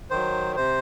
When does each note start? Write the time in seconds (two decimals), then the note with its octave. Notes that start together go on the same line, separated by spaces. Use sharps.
0.10 D#3 F#3 C5
0.56 C3 C5